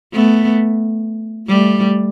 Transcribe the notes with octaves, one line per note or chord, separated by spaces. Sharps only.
A3 B3
G3 A3